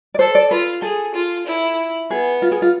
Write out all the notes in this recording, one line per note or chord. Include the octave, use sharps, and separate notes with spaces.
D5
A4 C5
D5
F4 B4
G#4 A4
F4
E4
B3 G#4
F4
G#4
F4